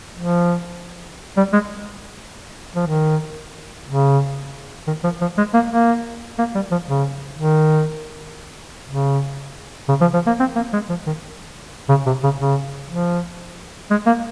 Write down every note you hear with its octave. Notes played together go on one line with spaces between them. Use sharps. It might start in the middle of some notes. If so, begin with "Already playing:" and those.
F3
G3
G#3
F3
D#3
C#3
D#3
F3
F3
G#3
A#3
A#3
A#3
G3
F3
C#3
D#3
C#3
C#3
F3
F3
A#3
C4
A#3
G#3
F3
D#3
C#3
C3
C#3
C#3
F3
G#3
A#3